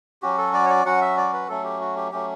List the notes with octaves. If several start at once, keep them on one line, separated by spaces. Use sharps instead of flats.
F#3 C#4 F#4 G4
A4
D5
C#5
D5
F#3 C#4 F#4 F#5
E5
D5
B4
F#3 A3 C#4 A4
G4
F#4
G4
F#3 A3 C#4 G4